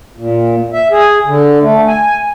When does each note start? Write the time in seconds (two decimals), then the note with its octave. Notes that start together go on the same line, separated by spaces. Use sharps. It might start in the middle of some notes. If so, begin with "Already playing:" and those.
0.16 A#2
0.73 E5
0.91 G#4
1.26 D3
1.61 A3
1.87 G#5